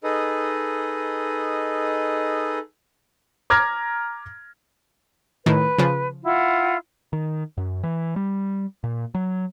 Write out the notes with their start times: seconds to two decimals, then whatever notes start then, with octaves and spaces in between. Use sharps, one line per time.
0.04 D#4 G#4 A4 B4 D#5
3.50 A#5 D6 F6 G#6 A#6
5.46 A2 D#3 B4
5.78 C#3 F3
6.24 E4 F4 F#5
7.13 D#3
7.57 F#2
7.83 E3
8.16 G3
8.84 A#2
9.15 F#3